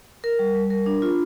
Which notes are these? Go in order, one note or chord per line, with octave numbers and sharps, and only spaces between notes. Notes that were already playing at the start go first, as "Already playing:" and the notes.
A#4
G3
G3
A#4
D4
F4